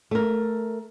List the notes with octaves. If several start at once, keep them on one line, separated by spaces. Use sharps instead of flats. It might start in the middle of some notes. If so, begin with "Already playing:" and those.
A3 A#4